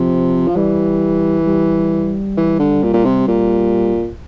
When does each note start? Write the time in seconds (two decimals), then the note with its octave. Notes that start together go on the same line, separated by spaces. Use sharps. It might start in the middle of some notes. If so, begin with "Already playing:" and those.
Already playing: C3 F3
0.48 F3
0.55 E3 G3
1.46 G3
2.37 E3
2.59 D3
2.83 A#2
2.93 A#2
3.05 C3
3.28 A#2